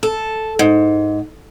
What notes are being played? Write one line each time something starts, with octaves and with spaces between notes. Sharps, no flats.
A4
G#2